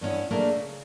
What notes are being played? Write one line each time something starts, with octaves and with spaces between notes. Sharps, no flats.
G2 B3 C#4 E4
A3 A#3 D4 G#4 A#4
C#3